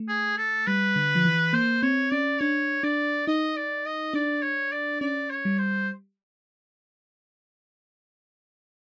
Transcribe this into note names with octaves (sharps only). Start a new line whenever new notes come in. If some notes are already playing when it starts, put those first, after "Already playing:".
Already playing: A3
G#4
A4
G3 B4
D3
F3
E3
A#3 C5
C4 C#5
C#4 D5
D4 C#5
D4 D5
D#4 D#5
D5
D#5
D4 D5
C#5
D5
C#4 D5
C#5
G3
C5